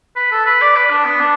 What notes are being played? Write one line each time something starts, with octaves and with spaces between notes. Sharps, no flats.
B4
A4
B4
D5
B4
D4
B3
D4